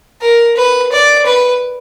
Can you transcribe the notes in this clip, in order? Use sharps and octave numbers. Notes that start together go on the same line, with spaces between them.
A#4
B4
D5
B4